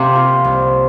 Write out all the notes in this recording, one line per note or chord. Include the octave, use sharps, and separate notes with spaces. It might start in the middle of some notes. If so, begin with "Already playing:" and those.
Already playing: C3 A#3
F4
C2